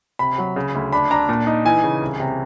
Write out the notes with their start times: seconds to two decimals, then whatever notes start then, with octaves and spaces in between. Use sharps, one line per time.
0.19 C3 B5
0.38 F#3
0.56 C#3
0.75 D2
0.93 D4 B5
1.11 D4 A#5
1.29 A#2
1.47 D#4
1.65 E3 G#5
1.83 C#3
2.01 C2
2.20 C3